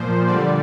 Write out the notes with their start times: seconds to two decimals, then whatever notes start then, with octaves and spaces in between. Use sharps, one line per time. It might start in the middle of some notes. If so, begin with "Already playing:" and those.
Already playing: A#2 F3 C5
0.27 D3 G3 D5